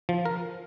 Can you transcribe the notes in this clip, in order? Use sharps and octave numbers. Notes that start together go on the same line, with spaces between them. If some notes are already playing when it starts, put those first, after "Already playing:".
F3
A#4